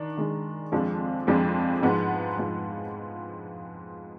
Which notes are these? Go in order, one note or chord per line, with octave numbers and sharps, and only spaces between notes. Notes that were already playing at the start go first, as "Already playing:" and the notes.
Already playing: D#3 D4
D#3 G#3 D4
F2 F3 G#3 D4
F2 F3 G#3 D4
G#2 F3 G#3 B3
G#2 F3 G#3 B3